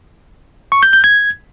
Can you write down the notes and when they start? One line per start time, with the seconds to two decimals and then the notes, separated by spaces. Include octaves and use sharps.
0.72 C#6
0.83 G6
0.93 G6
1.04 G#6